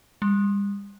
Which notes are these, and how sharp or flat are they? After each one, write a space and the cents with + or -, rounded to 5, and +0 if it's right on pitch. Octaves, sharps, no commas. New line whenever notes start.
G3 +40